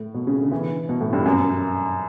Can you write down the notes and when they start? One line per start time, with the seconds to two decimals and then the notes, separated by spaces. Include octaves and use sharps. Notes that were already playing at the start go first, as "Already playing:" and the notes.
Already playing: A2
0.14 B2
0.27 C#3
0.40 D3
0.51 E3
0.89 B2
1.01 A2
1.13 G2
1.26 F#2